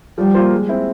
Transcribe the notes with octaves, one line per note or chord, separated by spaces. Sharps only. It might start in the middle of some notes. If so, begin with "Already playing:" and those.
F3 G3
A#3 F4 C5
G#3
C4 E4